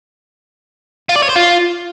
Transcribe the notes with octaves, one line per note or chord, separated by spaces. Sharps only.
F4
D5
C#5
C5
F4